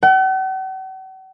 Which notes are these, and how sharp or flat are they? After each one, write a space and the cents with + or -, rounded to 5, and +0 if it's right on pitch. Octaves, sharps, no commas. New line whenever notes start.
F#5 +45